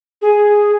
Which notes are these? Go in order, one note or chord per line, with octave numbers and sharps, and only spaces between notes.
G#4